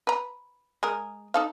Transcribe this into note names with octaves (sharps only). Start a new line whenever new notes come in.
B4 A#5
G#3 G#4 A#4
D#4 A4 F5